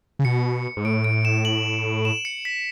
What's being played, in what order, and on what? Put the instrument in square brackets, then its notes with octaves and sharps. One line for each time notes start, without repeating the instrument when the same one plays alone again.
[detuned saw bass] C#3
[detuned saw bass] B2 [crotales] C#7
[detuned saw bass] G#2
[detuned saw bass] A2 [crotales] D7
[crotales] D7
E7
F#7
E7
C#7
B6